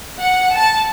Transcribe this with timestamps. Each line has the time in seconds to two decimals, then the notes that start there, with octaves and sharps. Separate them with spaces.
0.18 F#5
0.54 A5